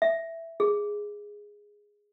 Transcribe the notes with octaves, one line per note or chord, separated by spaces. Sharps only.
E5
G#4